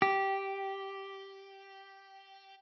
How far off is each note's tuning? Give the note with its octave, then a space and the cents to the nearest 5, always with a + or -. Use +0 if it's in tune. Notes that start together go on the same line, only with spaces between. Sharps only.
G4 -5